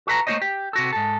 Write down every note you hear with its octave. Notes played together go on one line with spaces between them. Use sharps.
F#4 A4 B4 A#5
A3 A#3 D#4 C5 C#5 D#5
G4
C3 F#4 A4
G#2 A4